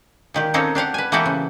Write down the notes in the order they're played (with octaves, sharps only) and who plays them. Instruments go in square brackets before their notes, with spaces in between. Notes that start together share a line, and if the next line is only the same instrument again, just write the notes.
[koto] A#2 D#3 G4
A#3 C4 C#4 D#4 A4 A#4
D4 G4 F5 F#5
B4 G#5
E3 A#3 B3 F#4 G4 A4
C#3